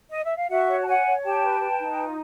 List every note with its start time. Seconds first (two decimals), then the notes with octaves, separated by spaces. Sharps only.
0.11 D#5
0.24 E5
0.37 F5
0.50 F#4 E5 F#5
0.69 C#5
0.83 A5
0.87 C#5 F#5 G#5
1.06 C#5
1.24 G4 G5 A5
1.43 B4
1.62 B4
1.81 D#4
1.99 F4